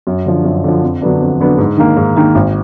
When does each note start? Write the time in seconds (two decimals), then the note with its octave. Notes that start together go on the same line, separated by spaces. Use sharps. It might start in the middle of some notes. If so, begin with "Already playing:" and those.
0.07 F#2
0.26 D3 F3
0.45 F#2
0.64 D3 F3
0.82 F2
1.02 D3 F#3 B3 D4
1.21 F2
1.40 D3 F#3 B3 D4
1.58 G#2
1.77 D#3 A#3
1.97 G#2
2.17 D#3 A#3
2.35 G#1